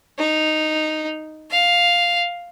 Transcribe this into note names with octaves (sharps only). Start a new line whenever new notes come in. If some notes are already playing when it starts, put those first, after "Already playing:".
D#4
F5